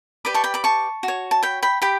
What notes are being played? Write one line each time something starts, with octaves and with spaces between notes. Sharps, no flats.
G4 B4 D5 B5 D6
A5 C#6
G5 B5
B5 D6
A5 C#6
F#4
C#5
A5
G5 B5
G5 B5
G4 G5 B5